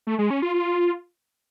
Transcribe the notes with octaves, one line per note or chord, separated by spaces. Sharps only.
A3
G#3
C#4
F4
F4